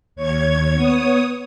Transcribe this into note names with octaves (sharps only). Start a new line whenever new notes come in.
D#2 C#5 G#6
B3 C#5 D#6